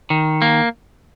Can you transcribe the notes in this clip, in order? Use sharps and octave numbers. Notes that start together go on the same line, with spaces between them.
D#3
A#3